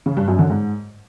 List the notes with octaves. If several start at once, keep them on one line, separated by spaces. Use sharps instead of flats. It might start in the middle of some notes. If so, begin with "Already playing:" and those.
C#3
G2
F#2
D3
G#2